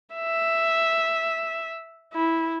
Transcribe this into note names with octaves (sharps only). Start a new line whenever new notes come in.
E5
E4